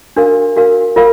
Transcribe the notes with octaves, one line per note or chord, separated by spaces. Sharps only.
D4 F#4 A#4 F5
D4 F#4 A#4 F5
F4 A#4 F5